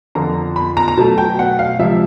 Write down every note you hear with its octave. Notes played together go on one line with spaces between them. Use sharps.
F2 D3 F3 A#5
B5
A#5
A#5
B2 F#3 A3 A5
G5
F#5
F5
C#2 C3 F3 E5